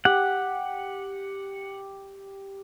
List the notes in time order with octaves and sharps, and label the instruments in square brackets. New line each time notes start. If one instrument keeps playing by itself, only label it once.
[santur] G4 [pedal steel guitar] F#5